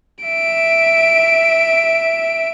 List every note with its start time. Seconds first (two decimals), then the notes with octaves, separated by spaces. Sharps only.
0.24 E5 D7